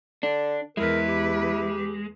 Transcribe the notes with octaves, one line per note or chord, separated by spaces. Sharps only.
D3 D4
E2 G#3 E4 A#4 B4
G4